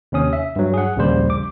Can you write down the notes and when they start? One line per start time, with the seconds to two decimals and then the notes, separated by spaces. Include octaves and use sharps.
0.12 D#2 C3 C#4 D#6
0.33 E5
0.56 G2 F#3
0.74 G#4 F#5
0.96 A#1 D#2 C#3 G3 C5
1.30 D6